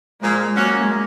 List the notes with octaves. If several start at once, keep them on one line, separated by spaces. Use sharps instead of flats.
A#2 F3 G#3 A#3
F#3 A#3 C#4 F#4
G#3
A#3